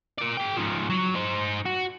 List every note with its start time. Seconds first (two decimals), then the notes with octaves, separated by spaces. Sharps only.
0.19 A#4 D5
0.37 G#4 G5
0.56 G#2 F3
0.90 F#3
1.15 D#4 C5
1.66 F#4